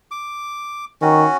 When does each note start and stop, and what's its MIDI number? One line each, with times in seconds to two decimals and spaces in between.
0.11 0.85 86
1.02 1.26 51
1.02 1.37 61
1.02 1.37 66